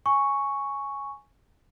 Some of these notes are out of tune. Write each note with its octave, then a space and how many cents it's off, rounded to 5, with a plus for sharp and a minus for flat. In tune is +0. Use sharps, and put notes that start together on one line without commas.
G#5 +0 C#6 +0